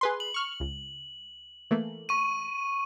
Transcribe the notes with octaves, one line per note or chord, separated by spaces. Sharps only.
G#4 B4 C6
F#7
C#6 F6
C#2
E3 A3 A#3
C#6 D#7